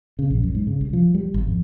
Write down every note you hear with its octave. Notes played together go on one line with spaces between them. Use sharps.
C#3
A#1
F#2
G#2
C#3
C2
F3
G3
G#1
F2